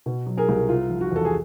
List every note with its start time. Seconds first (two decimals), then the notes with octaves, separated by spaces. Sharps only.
0.06 B2
0.26 F#3
0.37 G#4 A#4
0.49 C2
0.69 C3 F4
0.90 F3
1.01 F#4
1.11 E2
1.16 A4
1.25 G#4